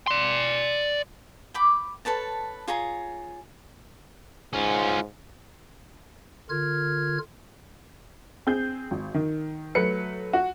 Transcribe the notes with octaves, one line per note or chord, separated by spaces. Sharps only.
D5 C6
G5 B5 D6
A4 B4 C#5 A5
F4 G#4 C#5 A#5
G#2 C#4 F4
D3 F4 A#4 F6 G#6
C4 G#4 G6
G#1
D#3
F#3 A3 B4 C#7
F#4